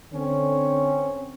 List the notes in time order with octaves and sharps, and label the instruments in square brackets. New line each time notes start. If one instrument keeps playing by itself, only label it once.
[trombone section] D3 C4 C#4